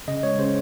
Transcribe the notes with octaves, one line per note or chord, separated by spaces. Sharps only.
C#3 D#5
G#3 C#5
C#3 C5